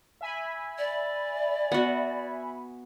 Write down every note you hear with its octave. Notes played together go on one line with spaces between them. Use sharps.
E5 G#5 B5
D5
B3 F#4